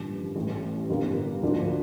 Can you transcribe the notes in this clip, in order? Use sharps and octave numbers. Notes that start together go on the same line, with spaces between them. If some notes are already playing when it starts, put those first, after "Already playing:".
Already playing: A1 G2 D3 F3 A#3
A1 A2 E3
G1 F2 D3 G3 A#3
D2 D3 F3 A#3 D4